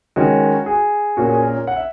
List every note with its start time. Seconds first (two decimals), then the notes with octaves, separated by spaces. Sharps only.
0.16 D#3 G#3 C#4 F#4
0.66 G#4
1.17 A#2 A#3 C#4 F#4
1.29 G#4
1.42 A#4
1.55 C#5
1.67 F#5
1.76 E5